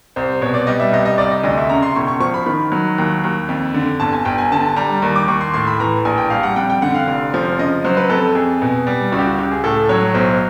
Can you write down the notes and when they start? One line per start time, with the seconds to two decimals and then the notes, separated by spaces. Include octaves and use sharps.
0.16 C2 C5
0.42 B2 C#5
0.54 D5
0.67 G3 D#5
0.80 E5
0.93 C2 D#5
1.05 D#5
1.18 C2 D5
1.31 D#5
1.44 D2 D#5
1.57 E5
1.69 C#3 A#5
1.83 C6
1.95 E1 C#6
2.08 C#6
2.20 F3 C#6
2.34 B5
2.46 D#3 B5
2.72 F#3
2.98 D#2
3.23 D#2
3.49 F2
3.74 D3
4.00 G1 A5
4.12 G#5
4.25 G1 G5
4.38 G#5
4.52 D3 A5
4.76 G3 A#5
5.02 D#2
5.16 D6
5.28 D#2 C#6
5.41 C6
5.54 A2 C6
5.67 B5
5.80 E3 A#5
6.05 A#1 G#5
6.18 G5
6.30 G3 F5
6.43 F#5
6.56 F2 G5
6.70 G5
6.82 D3 F#5
6.94 F5
7.08 F1 F5
7.34 F3
7.58 C#3 D#5
7.84 F#3 C5
7.97 B4
8.10 F2 A4
8.35 F2 G#4
8.62 B2
8.87 G3
9.12 C#2 F#4
9.19 G4
9.26 F#4
9.38 C#2 G4
9.51 G#4
9.64 A2 A4
9.89 F#3 C#5
10.14 B1 C5